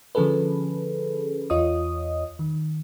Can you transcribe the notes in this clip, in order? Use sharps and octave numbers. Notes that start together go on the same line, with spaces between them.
D3 F3 C#4 G#4 A4 B4
E2 F4 C#5 D#5 D#6
D#3